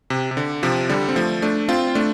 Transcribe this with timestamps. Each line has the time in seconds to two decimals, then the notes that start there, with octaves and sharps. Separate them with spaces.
0.10 C3
0.31 C3
0.37 D3
0.63 C3 F3
0.89 D3 G3
1.08 C4
1.16 F3 A3
1.42 A3 D4
1.68 C4 F4
1.95 A3 D4